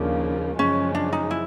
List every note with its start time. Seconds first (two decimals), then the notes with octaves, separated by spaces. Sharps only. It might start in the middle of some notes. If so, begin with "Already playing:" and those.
Already playing: D#2 C#3 F3 A#3 D4
0.58 F#2 C#3 F3 G#3 C#4
0.95 D4
1.13 D#4
1.31 E4